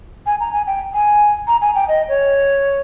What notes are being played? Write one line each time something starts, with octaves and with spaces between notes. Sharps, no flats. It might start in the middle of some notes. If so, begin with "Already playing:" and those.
G#5
A#5
G#5
G5
G#5
A#5
G#5
G5
D#5
C#5